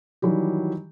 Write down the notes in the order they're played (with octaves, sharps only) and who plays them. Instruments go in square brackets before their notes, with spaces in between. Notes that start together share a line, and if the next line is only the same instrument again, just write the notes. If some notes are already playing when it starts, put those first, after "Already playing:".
[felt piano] D#3 E3 F#3 G3 G4